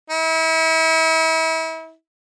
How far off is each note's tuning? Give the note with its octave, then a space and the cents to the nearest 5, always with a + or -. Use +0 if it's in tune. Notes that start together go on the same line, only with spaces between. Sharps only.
E4 -35